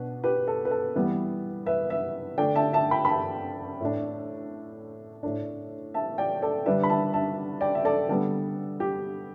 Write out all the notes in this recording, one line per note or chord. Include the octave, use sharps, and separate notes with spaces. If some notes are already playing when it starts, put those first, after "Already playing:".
Already playing: B2 D4 B4
G4 B4
A4
B4
A4
E3 G3 B3
B4 E5
B4 E5
D3 A3 D4 D5 G5
E5 A5
E5 A5
G5 B5
B5
E5 A5
A2 A3 D4
A2 A3 D4
E5 A5
D5 G5
A4 D5
D3 G3 D4 B4 E5
B5
E5 A5
E5 A5
D5 G5
E5
A4 D5
D3 G3 B3 A4
G4